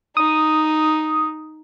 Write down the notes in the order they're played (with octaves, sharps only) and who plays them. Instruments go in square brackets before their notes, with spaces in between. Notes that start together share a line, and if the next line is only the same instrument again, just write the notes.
[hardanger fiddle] D#4 [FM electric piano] D#6